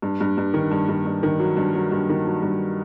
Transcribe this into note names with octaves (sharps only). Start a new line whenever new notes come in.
G2
G2
G2
D#3
G2
G2
G2
D#3
F#3
G2
F#3
G2
D#3
F#3
G2